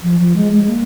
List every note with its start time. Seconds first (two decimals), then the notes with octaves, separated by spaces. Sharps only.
0.03 F3
0.20 F3
0.36 G#3
0.53 G#3
0.69 A#3